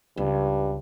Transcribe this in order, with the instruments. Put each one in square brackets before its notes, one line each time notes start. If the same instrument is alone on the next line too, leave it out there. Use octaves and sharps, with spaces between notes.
[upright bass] C#2 [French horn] G2